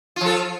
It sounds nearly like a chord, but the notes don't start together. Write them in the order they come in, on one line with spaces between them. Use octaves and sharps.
F4 F3 A4